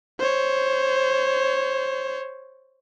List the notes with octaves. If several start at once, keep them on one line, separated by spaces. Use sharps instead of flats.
C5 C#5